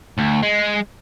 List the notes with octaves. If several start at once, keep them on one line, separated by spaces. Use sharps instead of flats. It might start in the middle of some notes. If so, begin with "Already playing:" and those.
D2
G#3